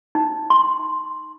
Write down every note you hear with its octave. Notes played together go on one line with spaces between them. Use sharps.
D#4
C6